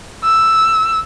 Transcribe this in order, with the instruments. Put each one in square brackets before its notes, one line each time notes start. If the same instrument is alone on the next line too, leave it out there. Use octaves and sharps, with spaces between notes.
[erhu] E6